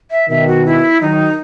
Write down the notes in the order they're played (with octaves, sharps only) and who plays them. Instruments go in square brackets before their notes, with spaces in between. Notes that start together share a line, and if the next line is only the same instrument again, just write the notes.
[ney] E5
[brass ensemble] B2 D#3 [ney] E5
[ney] F#4
E4
[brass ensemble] D#3 F#3 [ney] D#4